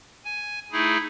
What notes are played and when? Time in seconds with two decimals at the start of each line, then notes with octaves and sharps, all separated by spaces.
0.25 G#5
0.72 A3 D#4 E4 G#4